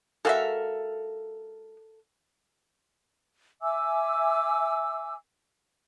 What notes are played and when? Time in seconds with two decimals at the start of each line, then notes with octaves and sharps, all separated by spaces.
0.25 G#3 F#4 A4 A#4 E5 F5
3.62 E5 G#5 D6 E6